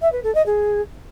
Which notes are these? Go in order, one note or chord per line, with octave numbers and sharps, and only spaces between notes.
E5
B4
A4
D#5
G#4